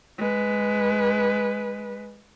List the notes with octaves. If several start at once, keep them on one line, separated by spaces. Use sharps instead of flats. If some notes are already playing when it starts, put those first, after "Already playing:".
G#3 B4